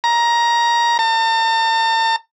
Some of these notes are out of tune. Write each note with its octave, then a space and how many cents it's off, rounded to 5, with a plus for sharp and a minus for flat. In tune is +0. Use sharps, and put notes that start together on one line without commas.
A#5 +15
A5 +45